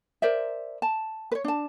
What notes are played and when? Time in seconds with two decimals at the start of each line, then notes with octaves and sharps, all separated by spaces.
0.22 A#4 C5 D5 E5
0.82 A5
1.32 B4 C#5
1.44 D4 A5